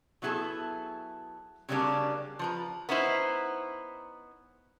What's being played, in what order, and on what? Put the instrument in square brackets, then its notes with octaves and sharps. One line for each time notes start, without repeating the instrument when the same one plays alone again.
[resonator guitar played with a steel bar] F#3 B3 E4 G#4 A4
C#3 F#3 G3 A#3 C#4 D4
F3 B4 A#5
B3 C#4 D#4 E4 C5